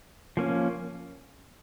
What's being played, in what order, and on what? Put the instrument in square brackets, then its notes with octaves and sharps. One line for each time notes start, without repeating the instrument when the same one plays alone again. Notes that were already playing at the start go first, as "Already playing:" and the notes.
[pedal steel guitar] F3 A#3 C#4